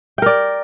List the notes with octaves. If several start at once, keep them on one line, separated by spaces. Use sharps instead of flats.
A#4 D5 G5